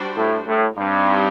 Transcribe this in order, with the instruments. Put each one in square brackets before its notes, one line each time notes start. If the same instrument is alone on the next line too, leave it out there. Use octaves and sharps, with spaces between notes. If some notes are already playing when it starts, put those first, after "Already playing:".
Already playing: [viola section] G3 D4 F#4 C5
[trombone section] A2
A2
[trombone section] G2 [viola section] G3 C4 D#4